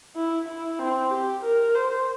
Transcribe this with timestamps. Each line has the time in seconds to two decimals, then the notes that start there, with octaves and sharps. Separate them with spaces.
0.16 E4
0.48 E4
0.79 C4
1.11 G4
1.43 A#4
1.75 C5